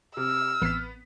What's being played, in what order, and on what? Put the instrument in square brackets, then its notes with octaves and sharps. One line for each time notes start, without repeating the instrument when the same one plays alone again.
[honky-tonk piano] C3 [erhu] E6 [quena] F6
[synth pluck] A1 C7 [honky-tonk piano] B3 B6